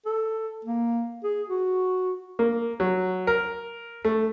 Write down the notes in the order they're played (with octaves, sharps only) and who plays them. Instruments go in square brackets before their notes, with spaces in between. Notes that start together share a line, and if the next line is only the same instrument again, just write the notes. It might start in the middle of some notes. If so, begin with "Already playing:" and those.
[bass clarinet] A4
A#3
G#4
F#4
[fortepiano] A#3
F#3
A#4
A3